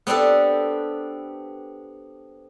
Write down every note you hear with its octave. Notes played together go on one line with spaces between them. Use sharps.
B3 C4 D4 G4 A4